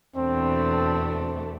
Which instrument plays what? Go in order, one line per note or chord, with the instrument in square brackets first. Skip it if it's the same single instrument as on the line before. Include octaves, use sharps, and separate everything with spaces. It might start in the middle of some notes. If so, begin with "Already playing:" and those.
[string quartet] E2 B2 A3 D4 [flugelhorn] C4